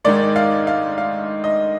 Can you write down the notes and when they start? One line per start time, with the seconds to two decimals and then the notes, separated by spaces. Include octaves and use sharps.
0.05 G#2 D#3 G#3 D5
0.36 F5
0.67 F5
0.98 F5
1.44 D#5